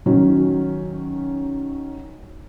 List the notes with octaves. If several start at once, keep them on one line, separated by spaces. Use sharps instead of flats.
D#3 F#3 C#4 F#4